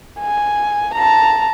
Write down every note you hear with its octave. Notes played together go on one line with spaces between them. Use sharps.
G#5
A5 A#5